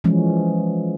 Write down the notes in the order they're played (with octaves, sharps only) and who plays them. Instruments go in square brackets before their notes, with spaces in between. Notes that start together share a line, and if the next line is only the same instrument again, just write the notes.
[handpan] E3 F3 G#3 C#4